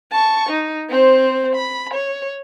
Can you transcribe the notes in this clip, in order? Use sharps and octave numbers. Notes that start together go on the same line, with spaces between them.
A5 C#6
D#4
C4 C5
B5
C#5